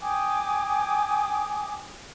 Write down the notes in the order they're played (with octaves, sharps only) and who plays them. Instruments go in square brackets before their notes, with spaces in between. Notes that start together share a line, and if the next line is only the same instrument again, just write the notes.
[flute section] G5 G#5 D6 D#6